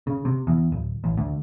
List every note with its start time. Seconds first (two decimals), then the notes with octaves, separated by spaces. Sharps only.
0.07 C#3
0.25 C3
0.47 E2
0.72 D1
1.04 A1
1.17 D2